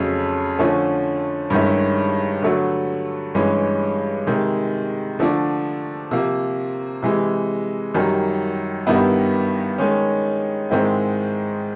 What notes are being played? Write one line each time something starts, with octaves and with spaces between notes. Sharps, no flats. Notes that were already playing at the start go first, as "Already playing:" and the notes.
Already playing: F2 C#3 F#3 A3
D3 F3 A3 C#4
G2 D#3 G#3 C#4 E4
D3 F#3 A3
G2 E3 G#3 C#4
C3 D#3 G#3
D3 F3 A3 D4
C3 F3 A#3
C3 E3 G#3
F#2 D#3 G3
G2 D#3 G3 B3 E4
D#3 G#3 C#4
G#2 D#3 G#3 C4 E4